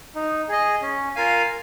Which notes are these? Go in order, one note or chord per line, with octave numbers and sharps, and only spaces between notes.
D#4
G#4 D#5
C#4
F4 A#4 F5 G#5